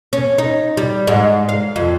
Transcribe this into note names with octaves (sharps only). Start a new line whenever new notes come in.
C#4
D#4
G3
G#2
F5
F2